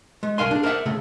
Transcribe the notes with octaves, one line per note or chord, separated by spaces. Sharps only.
G#3
C2 D#3 A#4 F5 G#5 C6
D4 G#4
A#4 C5 D5 E5 F#5
C#3 A3 G#4